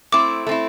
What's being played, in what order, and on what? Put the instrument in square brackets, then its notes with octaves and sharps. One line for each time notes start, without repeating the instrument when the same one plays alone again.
[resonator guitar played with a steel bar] A3 C4 E4 [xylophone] D6
[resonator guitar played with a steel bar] A3 C4 E4